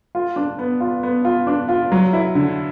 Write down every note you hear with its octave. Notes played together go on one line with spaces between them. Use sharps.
F4
D4
B3
F4
B3
F4
D4
F4
F#3
E4
D3